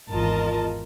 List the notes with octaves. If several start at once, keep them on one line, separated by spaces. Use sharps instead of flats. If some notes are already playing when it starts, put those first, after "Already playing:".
G#1 E2 F4 A#4 D#5 A5